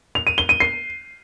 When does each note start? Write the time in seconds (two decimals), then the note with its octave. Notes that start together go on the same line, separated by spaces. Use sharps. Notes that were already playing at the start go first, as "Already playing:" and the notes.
0.15 F7
0.27 D#7
0.38 G7
0.49 D#7
0.60 C7